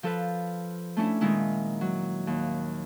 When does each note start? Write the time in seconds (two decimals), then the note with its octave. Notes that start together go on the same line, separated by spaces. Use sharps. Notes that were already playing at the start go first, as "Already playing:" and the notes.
0.03 F3 A4 B4
0.97 A3 C#4 D4 E4
1.21 A#2 D#3 G#3 E4
1.81 F#3
2.27 D#2